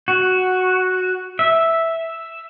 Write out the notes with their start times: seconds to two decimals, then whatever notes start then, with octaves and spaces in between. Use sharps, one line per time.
0.08 F#4
1.39 E5